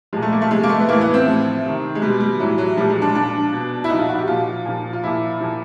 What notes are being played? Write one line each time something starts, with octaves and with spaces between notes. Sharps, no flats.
A#2 F3 G#3
A3
A#3
A3
C3 F3 G#3
A#3
A3
B3
A2 E3 A#3
B3
C4
A2 F3
C3 D#3
G#3
B2 G3
G3
A2 E3 F#3
F#3
A#2 F3 G3
G#3
D4
A#2 F3 D4
B2
E4
A#2 F3 D#4
F4
F#4
G4
A#2 F3 F4
A#2 F3
F4
A#2 F3 E4
A#2 F3